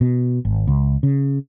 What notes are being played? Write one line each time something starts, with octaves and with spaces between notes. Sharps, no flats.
B2
G#1
C#2
C#3